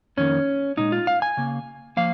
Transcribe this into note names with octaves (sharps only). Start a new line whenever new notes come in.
F2 D#3 A#3 C#4
A#2 F3 G#3 D#4
F4
F5
G#5
C#3 A#3
F3 A#3 F5